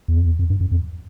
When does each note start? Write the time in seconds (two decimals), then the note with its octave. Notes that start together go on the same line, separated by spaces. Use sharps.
0.08 E2
0.17 F2
0.26 E2
0.39 F2
0.50 G2
0.61 F#2
0.71 F2